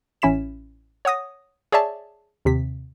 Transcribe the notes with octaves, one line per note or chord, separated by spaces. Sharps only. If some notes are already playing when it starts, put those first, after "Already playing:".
A1 C#4 E4 B6 E7
C#5 F#5 D#6 A#6
G#4 C#5 D5 E5 A5
D#2 C3 B6